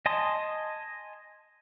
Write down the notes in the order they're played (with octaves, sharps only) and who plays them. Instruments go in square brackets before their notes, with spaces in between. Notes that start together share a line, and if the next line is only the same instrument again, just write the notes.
[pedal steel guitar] D#5 G#5 A5 C6 D#6